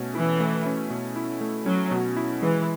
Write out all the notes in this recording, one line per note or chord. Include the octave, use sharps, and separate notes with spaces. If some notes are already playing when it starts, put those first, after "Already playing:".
Already playing: B2 A3 C#4
E3 E4
A3
C#4
B2
E4
A3
F#3 C#4
B2
E4
E3 G#3